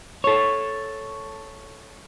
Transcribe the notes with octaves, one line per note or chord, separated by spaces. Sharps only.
A4 C#5